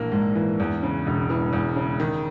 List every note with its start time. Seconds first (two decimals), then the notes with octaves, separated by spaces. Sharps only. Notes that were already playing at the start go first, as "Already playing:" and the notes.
Already playing: A#1 E3 A#3
0.12 G#2
0.35 E3
0.60 E2
0.83 C#3
1.07 E1
1.30 E3
1.53 E2
1.76 C#3
2.00 D#3